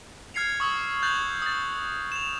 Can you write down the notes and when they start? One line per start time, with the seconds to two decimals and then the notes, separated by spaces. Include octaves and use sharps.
0.34 F6 G#6 C7 C#7 F7
0.60 C#6 D#6 E6
1.03 F#6 G6 A6 F7 F#7
1.42 D#6 A6
2.12 E7 F7